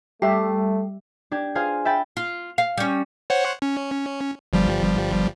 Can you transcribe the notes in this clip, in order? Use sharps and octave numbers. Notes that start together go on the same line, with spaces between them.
G3 A3 G4 E5
D4 G4 G#6
F4 G#4 C5 F5 G#5 F6
E5 G5 B5 G6 A6
F4
F5
G3 C#4
C5 C#5 F#5
C#4
G1 F3 G3